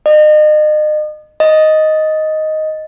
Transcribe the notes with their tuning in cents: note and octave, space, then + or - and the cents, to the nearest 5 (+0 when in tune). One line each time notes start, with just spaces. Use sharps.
D#5 -35
D#5 +5